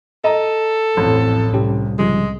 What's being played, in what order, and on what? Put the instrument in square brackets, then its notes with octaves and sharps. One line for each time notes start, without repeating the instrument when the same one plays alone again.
[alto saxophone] A4 [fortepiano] D#5 A#5
[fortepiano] A1 [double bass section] F2 A2
[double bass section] C2 [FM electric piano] C#4 G4
[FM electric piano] C#3 F3 G3 [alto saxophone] G#3